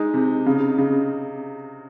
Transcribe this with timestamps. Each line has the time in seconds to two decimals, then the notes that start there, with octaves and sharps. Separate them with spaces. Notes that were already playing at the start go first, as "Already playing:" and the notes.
Already playing: G#3 D#4
0.14 C3
0.46 C#3
0.78 C#3